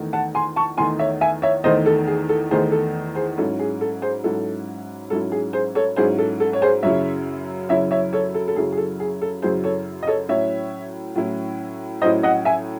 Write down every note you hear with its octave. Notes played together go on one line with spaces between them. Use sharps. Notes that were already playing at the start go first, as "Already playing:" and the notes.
Already playing: E2 D#3 A3 D#4
F#5 A5
G#5 C6
A5 C#6
E2 D#3 A3 D#4 G#5 C6
C#5 E5
E5 G#5
C#5 E5
E2 D#3 A3 D#4 C5 D#5
A4
G#4
A4
E2 D#3 A3 D#4 G#4 C5
A4
G#4 C5
G#2 F#3 C#4 E4 A4
G#4
A4
G#4 C5
G#2 F#3 C#4 E4 A4
G#2 F#3 C#4 E4 A4
G#4
G#4 C5
A4 C#5
G#2 F#3 C#4 E4 G#4 C5
A4
A4
C#5
G#4 C5
F#2 C#3 F#3 C#4 E4 C#5 E5
F#2 C#3 F#3 C#4 E4 C#5 E5
C#5 E5
A4 C#5
A4
A4
F#2 C#3 F#3 C#4 E4 G#4
G#4
A4
G#4
A4
F#2 C#3 F#3 C#4 E4 G#4 C5
A4 C#5
D#5
A4 C#5
A2 F#3 C#4 E4 C#5 E5
A2 F#3 C#4 E4
A2 F#3 C#4 E4 C5 D#5
D#5 F#5
E5 G#5